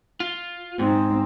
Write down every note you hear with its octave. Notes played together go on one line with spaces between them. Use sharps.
F4
G#2 C4 D#4